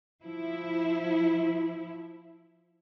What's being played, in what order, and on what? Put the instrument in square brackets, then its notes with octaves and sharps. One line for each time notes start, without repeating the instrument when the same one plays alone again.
[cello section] F3 E4